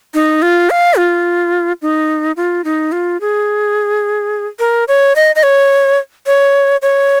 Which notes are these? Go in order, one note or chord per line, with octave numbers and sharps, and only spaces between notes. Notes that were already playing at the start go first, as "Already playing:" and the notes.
D#4
F4
F5
F4
D#4
F4
D#4
F4
G#4
A#4
C#5
D#5
D#5
C#5
C#5
C#5